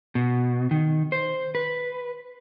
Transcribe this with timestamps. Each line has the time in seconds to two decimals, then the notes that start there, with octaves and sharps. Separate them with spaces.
0.15 B2
0.71 D#3
1.12 C5
1.55 B4